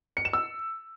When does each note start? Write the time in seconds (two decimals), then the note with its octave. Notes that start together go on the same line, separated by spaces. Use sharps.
0.17 C#7
0.25 E7
0.33 E6